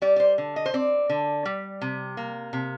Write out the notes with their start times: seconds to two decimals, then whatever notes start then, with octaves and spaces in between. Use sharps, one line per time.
0.02 G3 D5
0.16 D5
0.20 C5
0.38 D3
0.56 D#5
0.66 C5
0.74 C4 D5
1.09 D3
1.45 G3
1.81 C3
2.17 A#3
2.53 C3